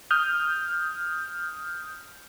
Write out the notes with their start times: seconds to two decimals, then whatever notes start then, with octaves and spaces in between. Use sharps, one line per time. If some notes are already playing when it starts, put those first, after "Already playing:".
0.11 D#6 F6 G6